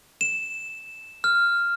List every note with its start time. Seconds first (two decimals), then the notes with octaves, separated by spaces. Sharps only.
0.21 E7
1.24 F6